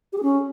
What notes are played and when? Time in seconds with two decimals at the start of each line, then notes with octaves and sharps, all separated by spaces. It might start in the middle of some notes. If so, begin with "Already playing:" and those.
0.13 G4
0.18 G#4
0.23 C#4